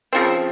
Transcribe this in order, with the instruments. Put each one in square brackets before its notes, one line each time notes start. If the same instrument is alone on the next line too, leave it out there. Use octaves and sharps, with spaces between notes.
[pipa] C#3 F3 C4